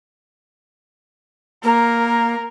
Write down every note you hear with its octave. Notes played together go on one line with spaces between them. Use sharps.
A#3 A#4